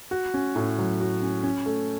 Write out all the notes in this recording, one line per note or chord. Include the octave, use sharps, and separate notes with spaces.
F#4
C#4
A2
F#3
F#4
C#4
C#4
A3